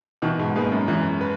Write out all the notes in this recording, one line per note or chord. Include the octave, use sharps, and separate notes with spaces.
B2 D#3 E3
G#2 B2
G#2 A#3 D#4 G#4 B4
F#2
F#2 E3
B4